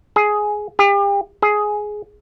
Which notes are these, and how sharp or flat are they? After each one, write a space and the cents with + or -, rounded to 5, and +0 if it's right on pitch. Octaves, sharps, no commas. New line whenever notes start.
G#4 +10
G4 +40
G#4 +10